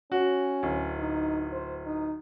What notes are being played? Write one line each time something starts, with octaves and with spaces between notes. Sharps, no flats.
C#4 F#4
D1
D#4
C5
D#4